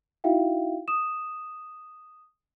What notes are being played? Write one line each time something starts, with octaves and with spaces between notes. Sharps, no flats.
D#4 E4 F#4 E5 F5 G5
D#6 E7